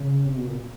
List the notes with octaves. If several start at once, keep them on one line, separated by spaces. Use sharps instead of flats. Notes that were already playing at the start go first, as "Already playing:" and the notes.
Already playing: C#3
C3
B2
A#2